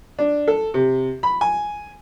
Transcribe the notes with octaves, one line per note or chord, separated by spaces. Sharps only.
D4
A4
C3
B5
G#5